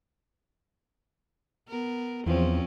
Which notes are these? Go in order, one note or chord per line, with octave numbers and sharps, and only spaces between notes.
B3 A#4
E2 F3 C4 C#4